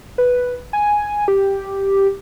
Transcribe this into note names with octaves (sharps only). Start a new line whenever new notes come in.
B4
G#5
G4